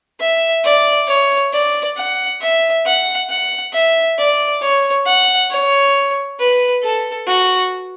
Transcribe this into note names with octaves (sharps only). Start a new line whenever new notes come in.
E5
D5
C#5
D5
F#5
E5
F#5
F#5
E5
D5
C#5
F#5
C#5
B4
A4
F#4